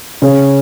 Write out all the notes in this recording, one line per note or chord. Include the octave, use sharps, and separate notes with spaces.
C#3 C#4